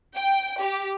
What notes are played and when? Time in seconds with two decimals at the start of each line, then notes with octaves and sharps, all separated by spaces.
0.17 G5
0.61 G4